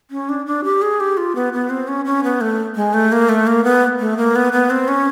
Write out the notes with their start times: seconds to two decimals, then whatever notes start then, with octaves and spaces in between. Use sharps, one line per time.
0.11 C#4
0.29 D4
0.46 D4
0.64 G4
0.82 G#4
1.00 G4
1.17 F4
1.36 B3
1.53 B3
1.70 C4
1.88 C#4
2.05 C#4
2.24 B3
2.41 A3
2.76 G#3
2.94 A3
3.12 A#3
3.29 A3
3.47 A#3
3.64 B3
4.00 A3
4.17 A#3
4.36 B3
4.53 B3
4.70 C4
4.88 C#4